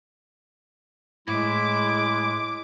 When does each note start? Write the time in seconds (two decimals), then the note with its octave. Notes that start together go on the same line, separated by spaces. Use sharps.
1.28 A2 G#3 E4 D6